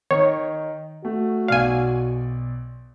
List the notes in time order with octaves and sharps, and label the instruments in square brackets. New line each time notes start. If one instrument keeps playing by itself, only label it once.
[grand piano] D#3 D#4 [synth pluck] C#5
[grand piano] A3 [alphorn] F#4
[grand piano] B1 D5 [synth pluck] F5 G#5